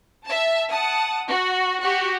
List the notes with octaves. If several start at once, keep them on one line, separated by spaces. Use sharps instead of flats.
E5 A5
F#5 A5 D#6
F#4
F#4 G4